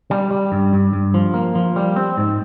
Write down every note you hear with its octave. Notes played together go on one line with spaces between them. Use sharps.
G3
G3
G2
G2
G2
F3
A#3
F3
G3
C4
G#2